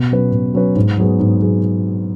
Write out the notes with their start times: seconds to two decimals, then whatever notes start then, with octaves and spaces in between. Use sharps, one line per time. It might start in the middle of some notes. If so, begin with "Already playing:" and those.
Already playing: B2
0.11 F#3 C#4 B4
0.32 B2
0.54 F#3 C#4 B4
0.76 G#2
0.98 F#3 B3 G#4
1.19 G#2
1.41 F#3 B3 G#4